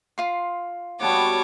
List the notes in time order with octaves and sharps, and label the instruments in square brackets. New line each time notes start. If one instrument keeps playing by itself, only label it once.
[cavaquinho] F4 C6
[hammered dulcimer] G3 B3 F#4 [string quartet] C#5 A5 D6